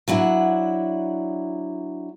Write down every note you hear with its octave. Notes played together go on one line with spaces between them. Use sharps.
F#3 D4 E4 F#5